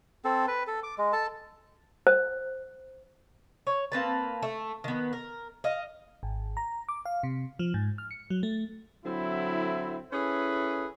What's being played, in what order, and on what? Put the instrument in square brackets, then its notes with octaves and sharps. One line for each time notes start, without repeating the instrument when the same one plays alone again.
[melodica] C4 A4
B4
A4
D6
G#3
A4 A5
[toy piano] C5
[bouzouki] C#5
A#3 C4 B4 A5
A3
D#3 B3
A#4
D#5 F5
[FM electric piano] G#1
A#5
D6
F5
C3
F3
G#2
F6
C#7
F#3
A3
[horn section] D3 F#3 C4 E4
C#4 E4 G#4 A4 B4